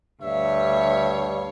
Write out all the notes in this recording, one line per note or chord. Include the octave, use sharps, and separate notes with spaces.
D2 G2 C#5 E5 F5